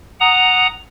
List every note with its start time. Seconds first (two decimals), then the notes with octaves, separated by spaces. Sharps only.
0.20 F#5 A#5 D#6